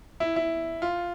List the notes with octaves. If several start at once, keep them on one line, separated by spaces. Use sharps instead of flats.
E4
E4
F4